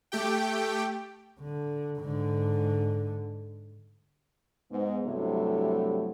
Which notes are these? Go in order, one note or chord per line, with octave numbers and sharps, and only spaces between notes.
A3 G4 G5
D3
G#2 D3
G#2 B3
G2 C3 F#3 A3 E4